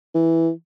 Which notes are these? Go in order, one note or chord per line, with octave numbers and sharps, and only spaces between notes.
E3